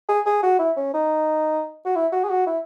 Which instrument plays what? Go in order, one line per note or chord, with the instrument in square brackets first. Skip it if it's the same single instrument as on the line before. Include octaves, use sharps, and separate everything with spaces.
[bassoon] G#4
G#4
F#4
E4
C#4
D#4
F#4
E4
F#4
G#4
F#4
E4